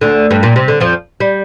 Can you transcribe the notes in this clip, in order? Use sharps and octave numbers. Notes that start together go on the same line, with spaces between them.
D2 D3
G2
A#2
C3
D3
F2 F3
G3